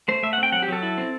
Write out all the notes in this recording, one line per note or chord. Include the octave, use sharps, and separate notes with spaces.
A3 C5
A3 E5
F#5
C4
G5
F#3 F#5
G4
F#3 A4
E4
C4